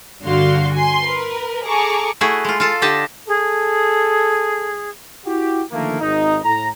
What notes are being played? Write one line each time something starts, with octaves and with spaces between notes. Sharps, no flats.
G2 D3 F#4 F5 C6
G#5 C6
A#4 B4
G#4 A4 A#5 C#6 D6
A3 E4 F#4 G#4
G#3 F4
F4 A4
D3 D4 G4 D#5 A5
G#4 A4
E4 F#4 G4
D3 D#3 F3 A3 A#3
G#1 D#4
A2 A#5